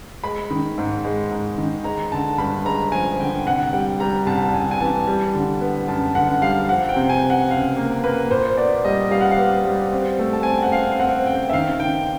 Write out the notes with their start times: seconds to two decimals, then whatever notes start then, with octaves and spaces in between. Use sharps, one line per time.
0.24 G#3 B5
0.51 D#3
0.78 G#2
1.05 G#3
1.31 G#2
1.58 D#3
1.84 G#3 A#5
2.12 D3 A5
2.38 G2 B5
2.65 G#3 A#5
2.92 F3 G#5
3.20 D3 G5
3.46 C2 F#5
3.73 G3 G5
4.00 G3 A#5
4.27 C2 A5
4.54 C2 G#5
4.71 G#5
4.80 E3 A5
5.07 G3
5.34 D3
5.61 B3
5.88 F#2 A5
6.15 D3 F#5
6.42 G3 F5
6.69 F3 F#5
6.89 G5
6.96 C3
7.09 G#5
7.23 C3
7.30 F#5
7.50 C#2 F5
7.77 A#3
8.04 A#3 B4
8.30 A#2 C5
8.57 B3 D5
8.85 G3 D#5
9.11 G3 F5
9.21 F#5
9.31 F5
9.38 B3
9.65 G3
9.92 C4
10.19 A3
10.33 A5
10.43 C4 G#5
10.53 G5
10.63 F#5
10.72 C4 F5
10.92 F5
11.00 C4 F#5
11.26 C#3 G5
11.50 E5
11.53 D#3 F5
11.80 D#3 G5